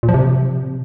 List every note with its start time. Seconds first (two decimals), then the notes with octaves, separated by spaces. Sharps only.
0.03 A#2
0.09 F3
0.14 C3